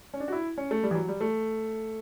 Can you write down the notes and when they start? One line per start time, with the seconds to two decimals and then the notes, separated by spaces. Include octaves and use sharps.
0.14 C#4
0.20 D4
0.28 F#4
0.32 E4
0.58 C#4
0.71 A3
0.83 G3
0.91 E3
0.95 F#3
1.08 G3
1.21 A3